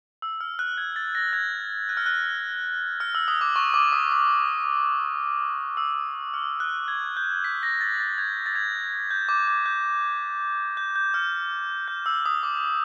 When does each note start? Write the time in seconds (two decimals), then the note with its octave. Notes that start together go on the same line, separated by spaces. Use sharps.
0.22 E6
0.41 F6
0.59 F#6
0.78 G#6
0.96 A6
1.15 A#6
1.33 G#6
1.89 F#6
1.97 F6
2.06 F#6
3.00 F6
3.15 E6
3.28 D#6
3.41 D6
3.56 C#6
3.74 D6
3.92 D#6
4.12 D#6
5.77 E6
6.34 F6
6.60 F#6
6.88 G#6
7.17 G6
7.44 B6
7.63 A#6
7.81 A6
8.00 A6
8.18 G#6
8.46 A6
8.55 G#6
9.11 G6
9.29 D6
9.48 D6
9.66 G6
10.77 G6
10.96 G6
11.14 F6
11.88 G6
12.06 E6
12.26 D#6
12.43 D6